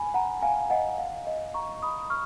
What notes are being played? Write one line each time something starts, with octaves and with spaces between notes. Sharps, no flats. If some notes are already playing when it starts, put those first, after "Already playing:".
Already playing: G#5 B5
F#5 A#5
F5 G#5
D#5 F#5
F5
D#5
A#5 C#6
B5 D#6
C#6 F6